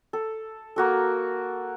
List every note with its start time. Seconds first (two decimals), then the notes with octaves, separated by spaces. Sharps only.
0.13 A4
0.76 A#3 F#4 A4